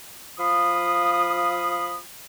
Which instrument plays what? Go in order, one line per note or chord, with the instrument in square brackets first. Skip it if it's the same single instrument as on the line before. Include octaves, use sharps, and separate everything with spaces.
[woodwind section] F3 F5 B5 D#6